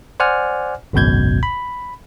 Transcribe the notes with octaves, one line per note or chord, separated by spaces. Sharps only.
C5 D5 F#5 G#5 F6
G#1 C#2 F#2 B2 G6 G#6
B5